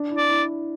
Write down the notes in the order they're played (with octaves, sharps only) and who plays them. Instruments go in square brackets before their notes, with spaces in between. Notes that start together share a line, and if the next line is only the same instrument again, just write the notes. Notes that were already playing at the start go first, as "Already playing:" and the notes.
Already playing: [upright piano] D4
E4
[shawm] D5
[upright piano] E4